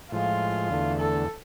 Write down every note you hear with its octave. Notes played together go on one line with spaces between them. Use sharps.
A2 F3 G#3 F4
E2 D3 A3
A4